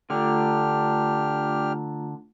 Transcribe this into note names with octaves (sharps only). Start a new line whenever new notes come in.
D3 A3 D4 F4 G4 A#5 F6